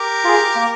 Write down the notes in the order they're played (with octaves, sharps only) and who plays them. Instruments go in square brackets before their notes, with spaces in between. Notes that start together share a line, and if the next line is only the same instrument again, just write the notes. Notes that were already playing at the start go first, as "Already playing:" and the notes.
Already playing: [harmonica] G4 A#4
[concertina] F4 G#4
A#3